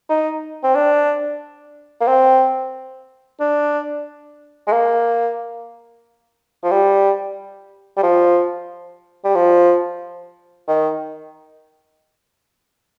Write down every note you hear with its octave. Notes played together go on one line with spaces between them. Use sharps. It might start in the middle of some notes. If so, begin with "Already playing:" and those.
D#4
C4
D4
A#3
C4
D4
G#3
A#3
F3
G3
G3
F3
G3
F3
D#3